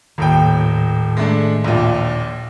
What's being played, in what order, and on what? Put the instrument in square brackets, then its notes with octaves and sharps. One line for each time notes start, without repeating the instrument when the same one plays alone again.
[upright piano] D#1 D#2 G5 [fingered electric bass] A2 D#3
[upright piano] G#3 A3 D4
A#1 D#2 A#2